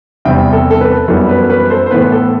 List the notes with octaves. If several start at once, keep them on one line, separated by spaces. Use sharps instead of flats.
E2 C3 G3 C4 E5 G5
A4
A4
B4
F#2 E3 G3 B3 A4
B4
B4
A4 C5
C5
A2 E3 B3 B4
A4